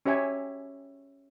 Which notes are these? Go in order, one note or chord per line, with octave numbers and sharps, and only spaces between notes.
C#4 G4 C#5 E5 G#5